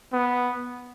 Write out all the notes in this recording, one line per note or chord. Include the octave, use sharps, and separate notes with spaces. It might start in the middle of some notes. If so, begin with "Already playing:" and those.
B3